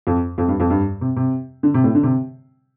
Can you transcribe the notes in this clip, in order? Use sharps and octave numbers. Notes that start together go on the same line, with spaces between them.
F2
F2
G2
F2
G2
C3
C3
D3
C3
A2
D3
C3